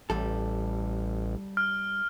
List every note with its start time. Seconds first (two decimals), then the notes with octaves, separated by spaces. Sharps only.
0.10 A1 G3 A4
1.57 F6